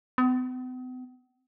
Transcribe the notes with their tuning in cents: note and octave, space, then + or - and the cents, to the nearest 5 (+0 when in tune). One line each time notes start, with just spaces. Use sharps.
B3 +45